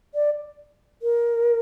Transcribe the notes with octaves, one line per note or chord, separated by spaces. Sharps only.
D5
A#4